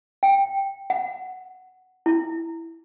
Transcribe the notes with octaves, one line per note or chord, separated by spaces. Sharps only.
G5
F#5
E4